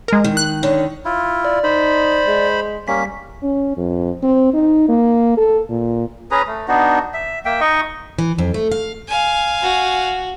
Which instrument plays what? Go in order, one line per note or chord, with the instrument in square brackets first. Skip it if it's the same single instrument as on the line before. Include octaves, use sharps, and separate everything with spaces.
[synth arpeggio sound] G#3 A#4
[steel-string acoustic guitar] D#3
[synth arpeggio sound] F#6
[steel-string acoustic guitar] D3 D#3 C#5
[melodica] E4 F4
[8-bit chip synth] D5
[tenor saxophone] D#4 [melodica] C5 B5
[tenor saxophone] G#3
[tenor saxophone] G3 [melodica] A#3 C#4 [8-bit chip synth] B6
[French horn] C#4
F2
C4
D#4
A#3
A4
A#2
[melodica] C#4 G#4 B4 A#5
A3
B3 D4 D#4 F#4
E5
A#3 E5 G5
D#4 D#5 C#6
[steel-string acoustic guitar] E3
F2
A3
F5
[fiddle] F5 G#5
[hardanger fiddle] F#4